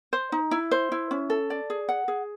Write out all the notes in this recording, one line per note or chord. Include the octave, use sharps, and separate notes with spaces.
C5
D#4
E4
C5
E4
C#4
A4
D5
G#4
F#5
G#4